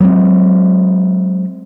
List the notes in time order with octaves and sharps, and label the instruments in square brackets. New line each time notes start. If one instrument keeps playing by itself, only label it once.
[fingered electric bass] F#3 G#3 B3 C4